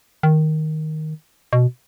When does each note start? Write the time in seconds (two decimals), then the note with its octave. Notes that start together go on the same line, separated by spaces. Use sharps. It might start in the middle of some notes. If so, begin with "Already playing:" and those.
0.23 D#3
1.53 B2